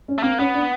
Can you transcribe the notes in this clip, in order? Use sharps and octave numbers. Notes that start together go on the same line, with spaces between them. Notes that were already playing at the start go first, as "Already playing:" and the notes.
C#4
A3
A#3 C4
B3 C#4
D4